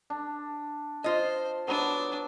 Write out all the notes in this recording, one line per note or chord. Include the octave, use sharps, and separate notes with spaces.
D4
F4 C5 D#5
F#3 B3 D4 C5